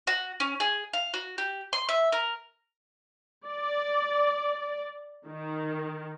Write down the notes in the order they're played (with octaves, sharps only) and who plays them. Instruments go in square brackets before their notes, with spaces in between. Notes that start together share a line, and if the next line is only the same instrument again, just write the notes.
[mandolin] F#4
C#4
G#4
F5
F#4
G4
C6
E5
A#4
[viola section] D5
D#3